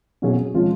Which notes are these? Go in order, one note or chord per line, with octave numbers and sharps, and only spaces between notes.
B2 F#3 C#4 G#4
F3 G#3 C#4 F4